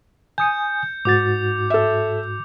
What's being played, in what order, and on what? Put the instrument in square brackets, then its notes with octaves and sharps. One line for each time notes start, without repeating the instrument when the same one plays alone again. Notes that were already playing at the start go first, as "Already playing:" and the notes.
[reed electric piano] G#5 D#6 [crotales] G6 C#7
[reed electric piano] G#2 F#4 A6 [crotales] D6
[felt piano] A4 E5